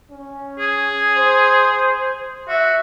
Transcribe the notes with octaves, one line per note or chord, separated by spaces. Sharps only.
C#4
G#4
C5
F#4 E5